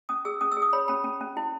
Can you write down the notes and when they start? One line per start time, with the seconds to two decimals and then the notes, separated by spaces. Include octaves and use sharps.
0.09 C#4 D#6
0.25 G#4 E6
0.41 C#4 D#6
0.51 E6
0.57 G#4
0.62 D#6
0.73 C#5 B5
0.88 C#4 B5
1.04 C#4
1.21 C#4
1.37 E4